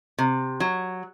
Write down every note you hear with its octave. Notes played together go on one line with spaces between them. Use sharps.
C3
F#3